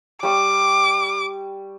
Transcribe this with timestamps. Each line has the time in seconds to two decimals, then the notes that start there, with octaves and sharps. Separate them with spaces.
0.23 G3 C#6 D6